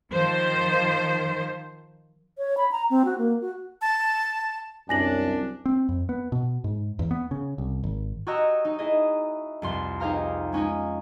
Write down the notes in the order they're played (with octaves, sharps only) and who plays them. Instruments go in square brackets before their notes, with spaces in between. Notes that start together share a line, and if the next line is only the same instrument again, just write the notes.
[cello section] D#3 F3 C5
[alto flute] C#5
B5
A#5
C4
F#4
A#3
F#4
[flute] A5
[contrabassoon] C2 [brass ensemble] F#2 [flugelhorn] D4 [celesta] G#5 A#6 F#7
[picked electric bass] C4
F2
B3
B2
G#2
E2
B3
C#3
C2
G#1
[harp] F#4 G4 C#5 D#5 A#5 E6
D#4
E4 G#4 D#5
C2 F2 C6
D#4 G4 G#4 C5 F5 A#5
G#3 C#4 D#4 G#5